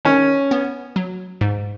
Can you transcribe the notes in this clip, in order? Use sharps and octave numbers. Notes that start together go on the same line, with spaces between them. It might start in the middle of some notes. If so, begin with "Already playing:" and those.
D#3 C#4
B3
F#3
G#2